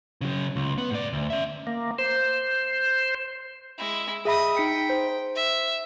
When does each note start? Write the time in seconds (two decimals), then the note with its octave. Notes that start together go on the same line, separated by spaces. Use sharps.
0.21 C#3 F#3
0.56 C#2
0.78 B3
0.91 G#2 D5
1.13 D2
1.30 C#4 E5
1.67 A#3
1.99 C5
3.78 G#3 E4
4.25 G#4 D#5 E5 B5 D#6
4.57 D#4 G5 B6 C#7
4.90 C5
5.36 E5